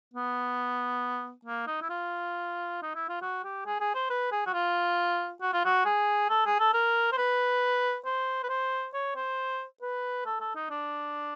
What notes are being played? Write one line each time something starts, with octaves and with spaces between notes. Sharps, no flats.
B3
A#3
D#4
E4
F4
D#4
E4
F4
F#4
G4
G#4
G#4
C5
B4
G#4
F#4
F4
F#4
F4
F#4
G#4
A4
G#4
A4
A#4
C5
B4
C5
B4
C5
C#5
C5
B4
A4
A4
D#4
D4